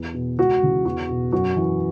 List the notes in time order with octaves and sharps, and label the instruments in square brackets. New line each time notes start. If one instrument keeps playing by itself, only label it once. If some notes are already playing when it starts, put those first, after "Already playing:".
Already playing: [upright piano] E2
B2
C#2 F#4
C#3 E3
E2 F#4
B2
F#2 F#4
E3